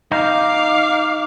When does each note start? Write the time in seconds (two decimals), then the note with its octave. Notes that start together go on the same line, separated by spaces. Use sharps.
0.11 D#4 F5 D6